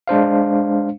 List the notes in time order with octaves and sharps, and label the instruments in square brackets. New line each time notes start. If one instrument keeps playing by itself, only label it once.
[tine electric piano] G#3 D4 C5 F5